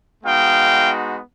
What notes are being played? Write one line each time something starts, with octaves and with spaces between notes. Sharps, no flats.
G#3 B3 D#4 F#4 F5 G5